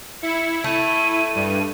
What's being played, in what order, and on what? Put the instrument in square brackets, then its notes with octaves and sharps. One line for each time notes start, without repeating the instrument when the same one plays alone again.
[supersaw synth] E4 [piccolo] C#7
[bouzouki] A3 [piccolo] D#7
[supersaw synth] G2